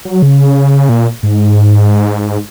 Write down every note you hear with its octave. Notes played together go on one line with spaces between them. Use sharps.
F#3
C#3
A#2
G#2